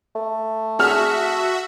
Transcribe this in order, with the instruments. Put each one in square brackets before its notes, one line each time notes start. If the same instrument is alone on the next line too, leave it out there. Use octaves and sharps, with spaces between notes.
[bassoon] A3
[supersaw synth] F#4 E5 [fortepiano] G#4 A5 F6